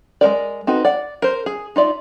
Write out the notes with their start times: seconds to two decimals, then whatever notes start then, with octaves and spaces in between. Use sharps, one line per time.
0.21 G#3 A#3 A#4 D5
0.67 C4 D#4 F#4 A4 B4
0.85 D5 F#5
1.22 A#4 C5
1.46 G#4
1.76 D#4 F4 D5 E5